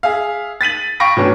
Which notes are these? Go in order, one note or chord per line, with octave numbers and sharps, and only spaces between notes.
G#4 E5 F5
A6 B6 D#7 F#7
F5 G5 B5 C#6 A#6 D7
A2 F#3 B3 C#4 D4